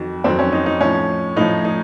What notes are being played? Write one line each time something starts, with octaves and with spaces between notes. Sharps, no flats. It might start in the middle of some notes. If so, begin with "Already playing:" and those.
Already playing: F2 D#3 F#3 F#4
F2 D#3 F#3 C4
C#4
D#4
D#4
A2 F3 C#4
A2 F3 D#4
D#4